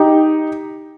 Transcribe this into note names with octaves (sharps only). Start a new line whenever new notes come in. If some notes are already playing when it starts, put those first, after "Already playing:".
Already playing: D#4 G4